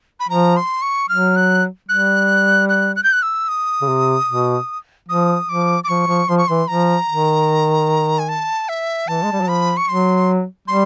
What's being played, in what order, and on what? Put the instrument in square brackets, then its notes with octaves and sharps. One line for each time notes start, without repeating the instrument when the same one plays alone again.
[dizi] B5
[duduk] F3 [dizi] A#5
[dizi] C6
C#6
[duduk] F#3 [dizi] F6
[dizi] F#6
[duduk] G3 [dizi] F#6
[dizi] F#6
F#6
G6
F#6
E6
D#6
[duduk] C#3
C3
B2
[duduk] F3 [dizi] D#6
[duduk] F3 [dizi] D6
[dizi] D6
[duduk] F3 [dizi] C#6
[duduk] F3
[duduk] F3 [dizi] C6
[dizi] C#6
[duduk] E3 [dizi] C6
[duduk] F3 [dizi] A#5
[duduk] D#3
[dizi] G#5
A5
E5
[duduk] E3 [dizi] A5
[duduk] G#3
G3
F#3
[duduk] F3 [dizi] B5
[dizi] C#6
[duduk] F#3 [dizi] C6
[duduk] G3 [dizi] C6